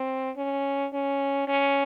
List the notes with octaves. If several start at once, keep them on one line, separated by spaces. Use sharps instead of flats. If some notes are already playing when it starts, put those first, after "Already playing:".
Already playing: C4
C#4
C#4
C#4